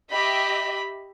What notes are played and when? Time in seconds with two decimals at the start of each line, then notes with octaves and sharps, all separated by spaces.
0.10 G4 D#5 E5 B5